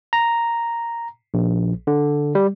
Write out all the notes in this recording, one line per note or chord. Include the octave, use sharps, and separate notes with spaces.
A#5
A#1
D3
G3